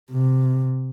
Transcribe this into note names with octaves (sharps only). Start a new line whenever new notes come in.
C3